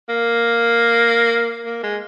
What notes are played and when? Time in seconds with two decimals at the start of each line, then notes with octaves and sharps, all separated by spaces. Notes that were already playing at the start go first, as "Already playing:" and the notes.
0.09 A#3
1.66 A#3
1.83 G#3